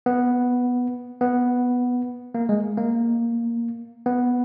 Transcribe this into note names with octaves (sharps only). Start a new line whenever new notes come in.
B3
B3
A#3
G#3
A#3
B3